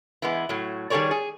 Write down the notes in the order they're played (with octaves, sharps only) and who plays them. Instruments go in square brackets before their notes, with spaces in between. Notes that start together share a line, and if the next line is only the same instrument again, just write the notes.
[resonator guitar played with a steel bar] E3 G#3 B3
A2 F#3
D#3 G3 G#4 A4 C#5 D5
G#4